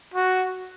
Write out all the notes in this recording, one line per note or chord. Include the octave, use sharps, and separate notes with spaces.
F#4